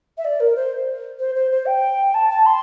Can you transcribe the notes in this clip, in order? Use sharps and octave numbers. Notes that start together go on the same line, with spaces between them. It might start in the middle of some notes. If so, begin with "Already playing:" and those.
E5
D5
A#4
C5
C5
C5
C5
G5
A5
A5
C6